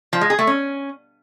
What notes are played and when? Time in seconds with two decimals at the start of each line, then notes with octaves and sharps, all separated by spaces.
0.13 F3
0.21 G#3
0.30 G#4
0.39 A3
0.47 C#4